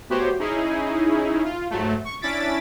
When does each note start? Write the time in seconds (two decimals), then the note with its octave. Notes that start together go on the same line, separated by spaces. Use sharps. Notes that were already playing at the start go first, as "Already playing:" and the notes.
0.09 A3 B3 F#4 G4 C5 C#5
0.39 C#4 D#4 E4 G#4
1.44 F4
1.70 G#2 F#3 A3
2.05 C#6
2.21 C#4 D4 E4 A6 B6 D7